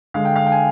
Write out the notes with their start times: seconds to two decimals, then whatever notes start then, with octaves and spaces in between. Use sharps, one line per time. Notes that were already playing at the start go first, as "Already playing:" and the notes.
0.14 D3 G#3 F5
0.25 G5
0.36 F5
0.47 G5
0.52 G#5